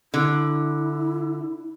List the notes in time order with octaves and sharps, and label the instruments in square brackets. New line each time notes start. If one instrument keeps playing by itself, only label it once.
[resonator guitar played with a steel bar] D3 [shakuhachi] E4